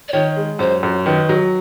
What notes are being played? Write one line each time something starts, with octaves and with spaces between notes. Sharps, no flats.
D5
D#3 C#5
G#3
F#2 C5
F#2
D#3 B4
F#3